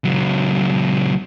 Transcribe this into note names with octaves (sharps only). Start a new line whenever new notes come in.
C#2 F#3